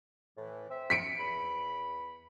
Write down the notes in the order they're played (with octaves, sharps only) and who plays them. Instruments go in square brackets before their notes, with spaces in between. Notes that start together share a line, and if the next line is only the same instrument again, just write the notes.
[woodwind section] A2 E3
C4 E5
[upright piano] B6 C#7 D7
[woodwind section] E2 B5